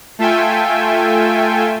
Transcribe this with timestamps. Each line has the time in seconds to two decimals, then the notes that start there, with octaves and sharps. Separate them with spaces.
0.19 A3 F4 A4 E5 G5 G#5